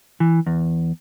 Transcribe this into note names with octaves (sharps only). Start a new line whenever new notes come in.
E3
E2